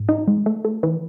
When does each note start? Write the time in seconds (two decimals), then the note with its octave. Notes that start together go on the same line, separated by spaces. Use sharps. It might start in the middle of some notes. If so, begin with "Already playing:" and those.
Already playing: G#2
0.09 D#4
0.28 G#3
0.46 A3
0.65 A3
0.83 E3